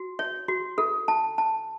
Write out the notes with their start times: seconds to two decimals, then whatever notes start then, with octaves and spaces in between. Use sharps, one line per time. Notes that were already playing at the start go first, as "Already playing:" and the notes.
Already playing: F#4
0.19 C#5
0.48 F#4
0.78 A4
1.08 A5
1.38 A5